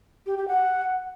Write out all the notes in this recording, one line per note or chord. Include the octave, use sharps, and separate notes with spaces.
G4
G4
F#5